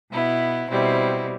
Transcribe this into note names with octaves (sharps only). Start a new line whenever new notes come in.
B2 B3 E4
B2 G3 C4 E4